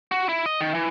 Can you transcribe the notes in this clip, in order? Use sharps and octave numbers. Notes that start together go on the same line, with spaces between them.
F#4
E4
D#5
D#3
E3